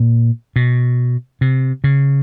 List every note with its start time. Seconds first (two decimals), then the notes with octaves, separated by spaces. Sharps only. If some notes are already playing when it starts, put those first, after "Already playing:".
Already playing: A#2
0.56 B2
1.41 C3
1.84 C#3